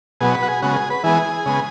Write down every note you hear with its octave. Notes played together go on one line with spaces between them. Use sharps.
B2 F#3 B3 G#4
B4
F#4
G#4
C#3 G#3 B3 F#4
G#4
B4
E3 G#3 B3 G#4
C#3 G#3 B3